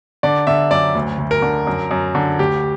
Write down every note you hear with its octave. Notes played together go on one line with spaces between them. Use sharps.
D3 D5
D3 E5
F#2 D5
D2
D2
A#4
D3
F#2
F#2
D3
D2 G4